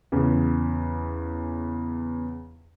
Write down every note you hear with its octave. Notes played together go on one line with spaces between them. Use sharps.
E2 C#3